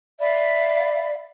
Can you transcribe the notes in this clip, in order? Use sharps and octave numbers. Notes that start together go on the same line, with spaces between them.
D5 E5 F5 B5